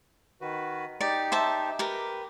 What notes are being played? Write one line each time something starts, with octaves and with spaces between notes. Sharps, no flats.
D#3 F#4 B4
D#4 G4 D5
C5 E5 A5
G4 A#4 B4